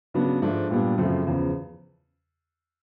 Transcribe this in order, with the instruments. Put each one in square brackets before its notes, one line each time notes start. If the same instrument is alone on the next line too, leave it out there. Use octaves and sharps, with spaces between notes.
[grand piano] C#3 F#3 B3 D4
G#2 F3 A3 D4
A#2 G3 B3 D4
F#2 C#3 F3 A3 C4
E2 C#3 F3